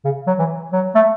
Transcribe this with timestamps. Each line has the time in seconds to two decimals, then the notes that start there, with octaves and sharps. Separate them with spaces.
0.05 C#3
0.27 F#3
0.39 E3
0.73 F#3
0.95 A3